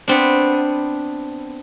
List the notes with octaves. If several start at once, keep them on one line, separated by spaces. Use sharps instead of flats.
B3 C4 D4